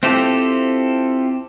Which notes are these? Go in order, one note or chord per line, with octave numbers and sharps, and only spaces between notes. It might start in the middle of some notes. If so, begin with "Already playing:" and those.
C4 E4 F4 G4 A4